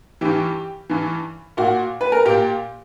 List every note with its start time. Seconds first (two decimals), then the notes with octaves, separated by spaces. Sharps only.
0.21 G2 E3 G4
0.90 G2 E3
1.57 A#2 F#4
2.01 B4
2.12 A#4
2.25 A#2 G4